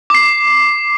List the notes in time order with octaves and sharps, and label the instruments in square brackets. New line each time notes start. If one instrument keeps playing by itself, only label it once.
[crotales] D6 C7